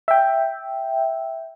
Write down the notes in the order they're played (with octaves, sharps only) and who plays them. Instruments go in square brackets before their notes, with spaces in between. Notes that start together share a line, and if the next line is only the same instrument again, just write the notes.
[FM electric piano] E5 G5